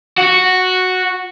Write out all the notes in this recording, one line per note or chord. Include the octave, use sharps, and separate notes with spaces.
F#4